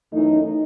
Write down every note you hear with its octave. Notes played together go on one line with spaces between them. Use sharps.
F#2 E3 A3 D#4